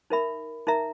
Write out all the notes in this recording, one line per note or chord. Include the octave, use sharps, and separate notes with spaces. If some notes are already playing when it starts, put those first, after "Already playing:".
D#4 A#4 E5 B5
D#4 A#4 E5 A#5